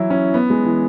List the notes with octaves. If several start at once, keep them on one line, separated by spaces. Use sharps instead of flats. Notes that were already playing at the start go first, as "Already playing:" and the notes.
Already playing: E3 F#3 E4
C#4
B3
G#3
E3